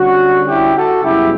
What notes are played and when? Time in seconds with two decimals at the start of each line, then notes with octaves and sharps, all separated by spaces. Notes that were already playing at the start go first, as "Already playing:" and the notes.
Already playing: D3 G3 C#4 F#4
0.46 E4 G4
0.75 F#4 A4
1.03 F#2 C#3 G3 B3 E4 G4